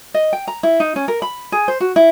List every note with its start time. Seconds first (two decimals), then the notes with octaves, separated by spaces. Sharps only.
0.14 D#5
0.33 G5
0.48 A#5
0.63 E4
0.80 D#4
0.96 C#4
1.08 A#4
1.22 B5
1.52 G#4
1.68 C5
1.80 F#4
1.96 E4